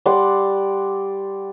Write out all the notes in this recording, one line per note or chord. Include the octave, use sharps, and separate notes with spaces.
G3 D5 F#5 C6